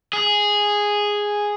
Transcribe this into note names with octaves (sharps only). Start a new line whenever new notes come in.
G#4